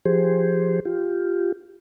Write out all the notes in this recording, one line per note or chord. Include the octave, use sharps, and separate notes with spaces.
F3 G4 G#4 C5
F4 G4